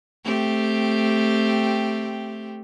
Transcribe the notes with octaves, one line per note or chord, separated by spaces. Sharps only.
A3 C4 G4